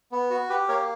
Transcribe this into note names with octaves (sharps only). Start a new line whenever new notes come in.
B3
F#4
G4 B4
A#3 A#4 C#5